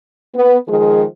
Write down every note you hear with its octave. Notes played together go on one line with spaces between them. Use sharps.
B3
D#3 F3 G#3 G#4